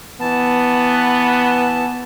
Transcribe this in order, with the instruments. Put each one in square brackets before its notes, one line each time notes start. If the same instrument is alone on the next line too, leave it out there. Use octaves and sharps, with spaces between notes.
[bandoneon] E3 A5 [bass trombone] B3